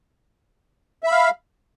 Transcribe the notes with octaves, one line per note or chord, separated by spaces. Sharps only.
E5 F5 B5